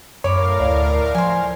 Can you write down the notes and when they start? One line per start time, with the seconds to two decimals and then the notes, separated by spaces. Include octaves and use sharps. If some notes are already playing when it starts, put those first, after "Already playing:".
0.24 F#2 A2 A#4 C#5 F5 B5 D6
0.60 D2 D5
1.15 F3 C5 G#5